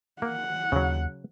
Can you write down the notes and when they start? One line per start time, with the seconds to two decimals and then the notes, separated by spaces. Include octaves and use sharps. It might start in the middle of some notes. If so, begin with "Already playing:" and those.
0.22 A#3 F#5
0.72 D#2 C#3 F#3